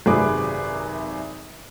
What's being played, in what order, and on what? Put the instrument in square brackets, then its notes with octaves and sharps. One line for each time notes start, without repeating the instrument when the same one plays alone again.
[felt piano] G#1 F#2 C3 G#4 B4 D6